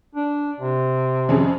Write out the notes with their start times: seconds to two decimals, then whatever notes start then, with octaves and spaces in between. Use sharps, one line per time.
0.15 D4
0.60 C3
1.29 F2 C#4 G#4